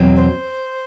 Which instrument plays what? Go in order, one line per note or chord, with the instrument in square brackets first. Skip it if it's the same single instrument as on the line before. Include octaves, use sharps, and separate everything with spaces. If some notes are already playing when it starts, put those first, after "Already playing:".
Already playing: [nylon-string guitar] E2 B2 F#3 C4
[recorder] C5